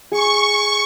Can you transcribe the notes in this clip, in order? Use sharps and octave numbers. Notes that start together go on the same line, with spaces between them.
G#4 C#6